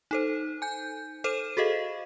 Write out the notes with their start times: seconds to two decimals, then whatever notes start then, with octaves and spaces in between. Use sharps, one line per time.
0.11 D#4 A4 C5
0.62 G#5 G6
1.24 A4 C5 D#7 E7
1.57 F#4 G#4 A4 D#5 F5